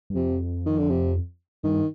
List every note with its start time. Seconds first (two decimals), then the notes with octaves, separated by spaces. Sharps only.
0.10 G2
0.15 F2 C3
0.66 D#3
0.78 D3
0.90 C3
1.64 G2 D#3